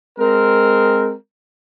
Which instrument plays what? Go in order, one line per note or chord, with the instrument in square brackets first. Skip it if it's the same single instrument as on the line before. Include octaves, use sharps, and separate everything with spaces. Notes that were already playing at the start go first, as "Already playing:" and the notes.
[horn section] G#3 C4 A#4